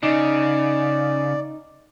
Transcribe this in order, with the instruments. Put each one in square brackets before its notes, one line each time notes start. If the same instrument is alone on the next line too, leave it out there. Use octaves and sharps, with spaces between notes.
[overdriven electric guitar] C#3 [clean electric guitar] D#4 [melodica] D5